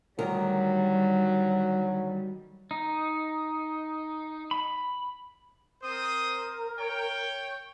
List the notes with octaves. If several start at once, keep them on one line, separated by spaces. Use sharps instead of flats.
D2 D#3 F#3 G3 A#4
D#4
B5
C4 A#4 C5 D#6
C#5 G5